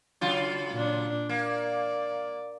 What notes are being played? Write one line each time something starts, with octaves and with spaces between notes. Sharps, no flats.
C#3 F#3 F4
A#2 D4
A#3 D5